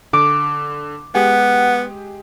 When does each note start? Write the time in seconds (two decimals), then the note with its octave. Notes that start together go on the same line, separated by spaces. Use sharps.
0.13 D3 D6
1.15 G#3 B3 G4 G#4 F#5